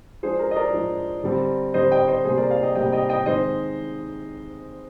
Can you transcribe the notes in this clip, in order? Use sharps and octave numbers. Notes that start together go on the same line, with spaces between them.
F3 G#3 D4 G#4 C5
A#4
D#5
A#4 D5
F3 G#3 D4
D3 G3 C4
D3 G3 C4 C5 D#5
D#5 G5
C5 D#5
C3 G3 A#3 G#4 C5
A#4 D5
D5 F5
D#5 G5
C3 G3 A#3 D#5 G5
D#5 G5
D#5 G5
D#3 G#3 C4 C5 D#5